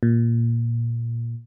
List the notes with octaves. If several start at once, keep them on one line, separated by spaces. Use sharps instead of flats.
A#2